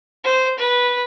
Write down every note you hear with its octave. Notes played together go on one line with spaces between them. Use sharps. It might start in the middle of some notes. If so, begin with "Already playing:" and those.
C5
B4